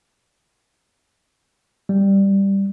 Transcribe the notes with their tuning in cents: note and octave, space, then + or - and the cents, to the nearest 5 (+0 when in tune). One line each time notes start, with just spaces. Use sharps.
G3 +5